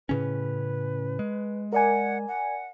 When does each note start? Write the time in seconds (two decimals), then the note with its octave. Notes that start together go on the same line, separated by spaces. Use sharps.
0.09 A2 C#3 C#4 B4
1.19 G#3
1.73 A#4 D5 F#5 G#5
2.28 F#5